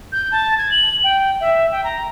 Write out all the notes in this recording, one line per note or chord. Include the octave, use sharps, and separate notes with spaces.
G6
A5
G#6
F#7
G5
E5
G5
A#5